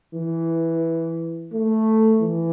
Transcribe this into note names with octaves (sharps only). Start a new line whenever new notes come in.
E3
A3
E3